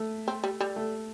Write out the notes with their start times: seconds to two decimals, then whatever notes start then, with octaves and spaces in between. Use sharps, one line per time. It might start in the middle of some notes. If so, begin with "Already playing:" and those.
Already playing: A3
0.28 C4
0.44 G3
0.60 G3
0.76 A3